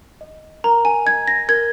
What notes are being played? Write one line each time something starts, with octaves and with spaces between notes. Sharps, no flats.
D#5
A#4 A#5
G#5
D#5 G#6
A#6
A#4 G#6